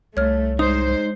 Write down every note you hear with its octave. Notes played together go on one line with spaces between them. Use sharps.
C2 A3 C#5 F6
G#3 D#4 C5 D#6